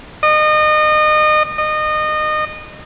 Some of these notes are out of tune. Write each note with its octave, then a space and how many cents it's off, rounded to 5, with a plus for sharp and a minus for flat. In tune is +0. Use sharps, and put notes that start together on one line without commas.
D#5 -30
D#5 -25